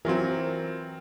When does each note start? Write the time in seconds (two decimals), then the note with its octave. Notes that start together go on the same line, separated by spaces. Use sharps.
0.05 E3 F#3 C4 F4 A#4